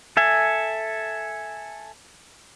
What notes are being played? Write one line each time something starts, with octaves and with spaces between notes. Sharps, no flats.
A4 E5 G#5